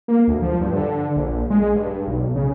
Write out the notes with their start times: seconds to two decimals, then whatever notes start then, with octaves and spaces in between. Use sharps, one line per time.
0.08 A#3
0.28 D2
0.42 F3
0.61 G2
0.76 D3
1.16 A#1
1.50 G#3
1.75 G2
2.07 B1
2.35 C#3